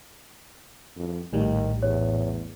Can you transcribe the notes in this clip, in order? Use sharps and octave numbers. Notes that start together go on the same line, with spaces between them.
F2
A#1 A2 D#3 G3
E2 C#5